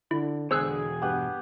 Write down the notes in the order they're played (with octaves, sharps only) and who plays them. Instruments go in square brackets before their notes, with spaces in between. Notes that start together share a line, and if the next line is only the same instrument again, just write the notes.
[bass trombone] D3 [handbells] E4
[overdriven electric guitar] E2 B2 [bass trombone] D3 [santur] G#4 G#5 [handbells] C5 E6 F#6
[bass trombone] G2 [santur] B3 G4 F#5